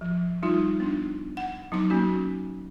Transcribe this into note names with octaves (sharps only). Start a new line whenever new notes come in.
F3
G3 D#4 F4
B3 D4
F#5
F#3 B3 D#4 D6
A#3 C#4 F#4